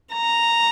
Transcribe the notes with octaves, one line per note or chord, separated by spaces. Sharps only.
A#5